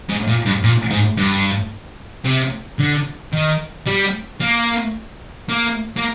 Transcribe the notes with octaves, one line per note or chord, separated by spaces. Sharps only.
G#2
A#2
G2
A#2
G#2
G2
C3
D3
D#3
G3
A#3
A#3
A#3